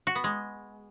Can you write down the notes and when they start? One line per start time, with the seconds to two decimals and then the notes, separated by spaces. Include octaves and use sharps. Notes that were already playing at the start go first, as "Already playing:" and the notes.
0.07 F#4
0.15 B3
0.24 G#3